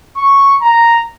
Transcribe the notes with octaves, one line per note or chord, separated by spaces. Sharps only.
C#6
A#5